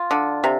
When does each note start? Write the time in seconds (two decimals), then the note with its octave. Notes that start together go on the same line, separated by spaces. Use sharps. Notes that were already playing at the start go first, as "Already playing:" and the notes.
Already playing: F4
0.11 D3
0.44 C3